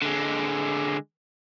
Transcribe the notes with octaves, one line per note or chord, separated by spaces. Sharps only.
D3 G#3